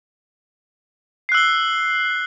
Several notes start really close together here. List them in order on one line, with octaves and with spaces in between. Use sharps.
C7 F#6 E6 G7